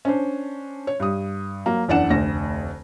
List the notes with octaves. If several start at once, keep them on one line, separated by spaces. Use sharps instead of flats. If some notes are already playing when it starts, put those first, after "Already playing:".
C#4 D4 C5
C#5
G2 D#6
F#3 A#3
F#1 E2 D4 D5 F#5 E7
F1 D2 A#6